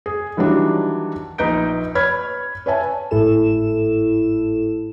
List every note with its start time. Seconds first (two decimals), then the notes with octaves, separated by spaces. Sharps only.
0.06 G#4
0.37 D#3 E3 F#3 G3 D4
1.38 A#1 D#4 B4 G6 D7
1.95 B4 C#5 B5 F6 G#6
2.66 B4 C#5 E5 G#5 A5
3.11 G#1 A2 E4 A4 E7